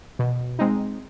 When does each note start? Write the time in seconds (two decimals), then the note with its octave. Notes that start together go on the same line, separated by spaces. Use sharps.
0.19 B2
0.59 G#3 C4 D#4